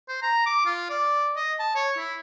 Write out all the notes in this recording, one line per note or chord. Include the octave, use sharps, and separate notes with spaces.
C5
A#5
D6
F4
D5
D#5
A5
C#5
E4